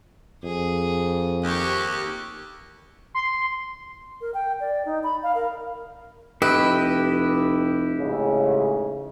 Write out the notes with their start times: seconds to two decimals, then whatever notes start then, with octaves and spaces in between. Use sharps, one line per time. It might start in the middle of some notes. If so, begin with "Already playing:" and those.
0.44 F2 G#4
1.43 D#2 G4 C#6
3.14 C6
4.21 A#4
4.34 G5
4.60 D5
4.85 D#4
5.04 B5
5.23 F5
5.35 A#4
6.42 F1 E4 G4 B4 D#5
7.99 A1 G#2 C#3